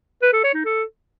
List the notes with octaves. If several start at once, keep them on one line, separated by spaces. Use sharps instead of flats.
B4
A4
C#5
D#4
A4